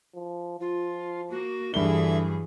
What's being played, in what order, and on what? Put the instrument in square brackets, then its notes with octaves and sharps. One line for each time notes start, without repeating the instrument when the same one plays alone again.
[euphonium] F3
[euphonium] F3 [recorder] F4
[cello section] A#3 [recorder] F#4
[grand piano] G2 G7 [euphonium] D3 [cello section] E3 F#3 G#4 [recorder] E5